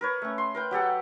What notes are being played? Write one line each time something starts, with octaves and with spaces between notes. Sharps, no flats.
A#4 B4 C#5
A3 C#4
C6
A#4 B4 G5
F#3 G4 A4 F#5